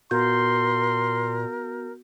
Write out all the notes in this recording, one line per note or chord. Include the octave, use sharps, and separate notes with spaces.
A#2 B3 F#4 A#4 C6 G6